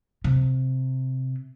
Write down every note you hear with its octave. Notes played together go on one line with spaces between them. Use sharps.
C3